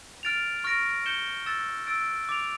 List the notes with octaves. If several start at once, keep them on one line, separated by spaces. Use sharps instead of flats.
F6 A6 D7 F7
C#6 F6 A#6 D7
G6 C#7 E7 G7
E6 A6 E7
E6 A6 D7
D6 A6 D7 F7